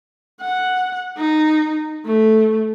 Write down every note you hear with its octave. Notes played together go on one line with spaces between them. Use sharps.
F#5
D#4
A3